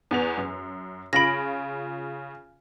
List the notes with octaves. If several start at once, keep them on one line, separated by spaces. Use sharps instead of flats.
E2 B3 F7
F#2
C#3 F4 B5 A#6 D7